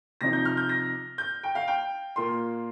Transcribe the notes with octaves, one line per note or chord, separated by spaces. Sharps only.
C3 F3 D#4 A#6
G6
F6
G6
A#6
G6
G5
F5
G5
A#2 A#3 F4 C6